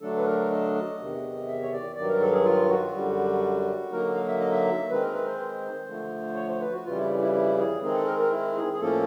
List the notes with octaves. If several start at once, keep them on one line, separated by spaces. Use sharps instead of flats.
D3 F#3 A3 D4 A4
B4
A#4
D#5
E2 C3 D#3
E5
C#5
D5
G2 D#3 F#3 D5
A#4
A4
G#4
F4
F#4
F#2 D3 G3
D3 F#3 A#3 D#4 A#4
F5
E5
D#5
E5
D#3 G#3 C4 D#4 B4
A#4
B4
C5
D3 F3 A3
C#5
C5
B4
F#4
F2 C#3 E3 G3 F4
E4
E4
E4
G#4
D#3 G#3 C4 D#4 G#4
A4
A#4
A#4
E4
G#4
G#4
A2 F3 A#3 C#4 A4